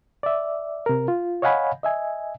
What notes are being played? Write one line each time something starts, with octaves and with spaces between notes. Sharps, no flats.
D5 E5
C3 A#4
F4
C#5 D#5 F5 F#5 G#5 B5
D#5 E5 G#5